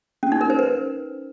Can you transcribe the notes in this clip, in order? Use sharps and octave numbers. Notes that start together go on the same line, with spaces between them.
C#4
D#4
A#4
C5
B4